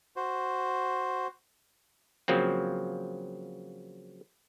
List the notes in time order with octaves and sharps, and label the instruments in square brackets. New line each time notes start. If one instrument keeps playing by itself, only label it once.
[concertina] F#4 C5
[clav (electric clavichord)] C#3 F3 F#3 A#3 C4